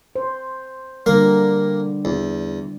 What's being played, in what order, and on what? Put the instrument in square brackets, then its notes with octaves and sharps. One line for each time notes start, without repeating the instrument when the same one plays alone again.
[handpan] C5
[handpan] D3 G3 [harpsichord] A#3 A#4
[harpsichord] E2